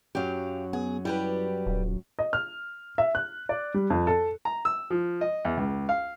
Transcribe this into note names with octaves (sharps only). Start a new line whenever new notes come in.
F#2 F#3 G4 F5
B3 G#4
G3 E4 G4 B4
D#1
D#5
F6
E5
F#6
D5
G3
F2
A4
A#5
E6
F3
D#5
E2
C#2
F5